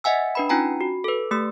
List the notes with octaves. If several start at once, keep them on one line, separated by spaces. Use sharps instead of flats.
D#5 E5 F#5 G#5 E6
D4 B4 B5
C#4 D#4 F4 G5 G#5 A#5
F#4
A4 B4
A3 G4 E6